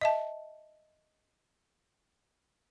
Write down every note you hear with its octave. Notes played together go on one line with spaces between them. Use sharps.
D#5 E5 A5